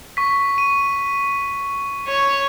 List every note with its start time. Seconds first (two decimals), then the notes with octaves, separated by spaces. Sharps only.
0.17 C#6 B6
0.58 D#7
2.08 C#5